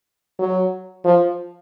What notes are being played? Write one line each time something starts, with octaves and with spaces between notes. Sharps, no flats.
F#3
F3